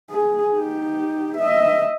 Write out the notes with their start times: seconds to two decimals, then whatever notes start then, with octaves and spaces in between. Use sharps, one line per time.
0.11 G#4
0.56 D#4 G4
1.38 D#5 E5